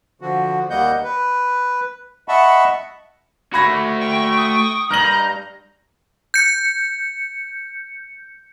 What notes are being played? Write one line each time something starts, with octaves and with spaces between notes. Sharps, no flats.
D3 F3 F#4
D#2 G3 A#3 D#5 F#5 G6
B4
D#5 E5 F#5 A5 B5 C#6
A3 F#4 B5 G#6 A#6
G5 C#6
D#6
G2 D#5 A#5 F6 G6 F#7
G6 C#7